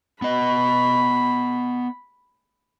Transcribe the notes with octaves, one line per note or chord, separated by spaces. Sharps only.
B3 D#5 B5